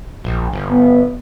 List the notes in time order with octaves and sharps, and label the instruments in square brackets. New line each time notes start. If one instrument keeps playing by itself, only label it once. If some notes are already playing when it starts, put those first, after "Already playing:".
[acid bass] A#1
G1
[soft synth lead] B3